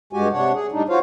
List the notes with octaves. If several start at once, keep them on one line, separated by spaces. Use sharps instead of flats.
G2 G#3 F#4 G4 G#5
C3 D4 C#5 F#5
G#4
A2 G3 D4 D#4
F4 F#4 C5 C#5 F5